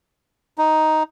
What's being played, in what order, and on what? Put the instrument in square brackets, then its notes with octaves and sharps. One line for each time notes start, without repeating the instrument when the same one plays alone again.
[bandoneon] D#4